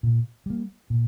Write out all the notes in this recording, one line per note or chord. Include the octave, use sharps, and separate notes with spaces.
A#2
G3 A#3
A#2